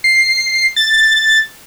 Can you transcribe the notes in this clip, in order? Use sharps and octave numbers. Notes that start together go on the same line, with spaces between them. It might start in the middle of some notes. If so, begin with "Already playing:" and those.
C7
A6